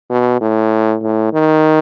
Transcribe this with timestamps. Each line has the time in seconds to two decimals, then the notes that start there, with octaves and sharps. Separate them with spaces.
0.09 B2
0.41 A2
1.02 A2
1.33 D#3